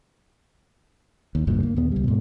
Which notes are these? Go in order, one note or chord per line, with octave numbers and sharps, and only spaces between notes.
D#2
F1 D2 G2 A#2
A#3
D#2 A#2 B3
C#2 G3
G#2 B2